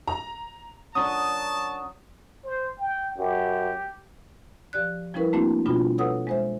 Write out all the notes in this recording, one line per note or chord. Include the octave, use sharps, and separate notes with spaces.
A#5
F#3 C#4 D4 A#4 A5 D#6
C5
G5
F#2 G4
F3 G4 D5 F#6
F3 G3 C#4 E4 A#4 B4
A3 A#3 C4 D4 E4 F#4
B2 G3 B3 D4 F4 F#4
A4 B4 C#5 F#5 D#6 E6
G#3 C5 E5